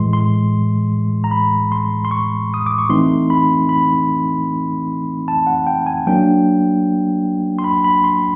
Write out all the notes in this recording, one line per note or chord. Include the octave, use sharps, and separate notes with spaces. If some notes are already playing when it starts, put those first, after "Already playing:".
Already playing: A2 E3 G#3 C6
C6
A#5
B5
C6
C6
C#6
D#6
D6
C#6
E3 A3 C4 D#4 C6
B5
B5
A5
F#5
G5
G#5
F#3 A#3 D4 G5
C6
B5
B5
C6